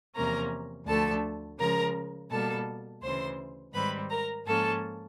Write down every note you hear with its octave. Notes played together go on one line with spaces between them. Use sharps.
E2 C3 F3 A#3 C#4 A#4 A#5
D2 D3 F3 A3 A4 A5
C#3 F3 G#3 A#4 A#5
B2 G3 A#3 A4 A5
D2 C#3 E3 C5 C6
G#2 D#3 G3 C4 B4 B5
A#4 A#5
G#2 F3 A#3 C#4 A4 A5